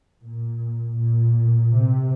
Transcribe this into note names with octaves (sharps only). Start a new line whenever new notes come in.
A#2
A#2
C3